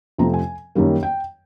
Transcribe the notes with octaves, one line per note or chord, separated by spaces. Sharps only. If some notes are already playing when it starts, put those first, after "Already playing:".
F2 C3 F3 A3 C4 A#5
G#5
F#2 D#3 G3 A#3
G5